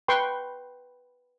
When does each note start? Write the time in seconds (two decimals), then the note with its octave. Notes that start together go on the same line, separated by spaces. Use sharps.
0.08 B4 G5 C6 C#6